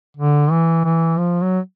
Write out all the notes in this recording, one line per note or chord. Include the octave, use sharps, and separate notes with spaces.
D3
E3
E3
F3
F#3